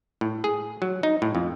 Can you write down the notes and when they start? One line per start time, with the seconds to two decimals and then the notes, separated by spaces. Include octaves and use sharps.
0.21 A2
0.44 G#4
0.82 F#3
1.03 D#4
1.22 A2
1.35 F2